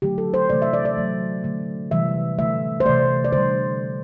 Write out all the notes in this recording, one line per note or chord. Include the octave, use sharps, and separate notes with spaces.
D3 F#3 A3 G4
A4
C5
C3 E3 A3 D5
E5
D5
D5
D3 F#3 A3
D3 A3
C3 E3 G3 E5
D3 A3 E5
C5
C3 E3 A3 D5
D5
D3 G3 C5